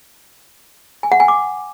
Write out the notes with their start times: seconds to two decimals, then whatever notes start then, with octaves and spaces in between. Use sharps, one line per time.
1.03 G#5
1.12 F#5
1.20 G#5
1.28 D6